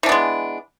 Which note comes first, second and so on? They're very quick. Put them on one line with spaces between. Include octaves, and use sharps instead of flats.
E3 D4 B3 G#3